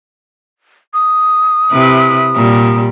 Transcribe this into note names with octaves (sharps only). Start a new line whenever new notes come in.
D#6
C3 E4 B4
A#2 G3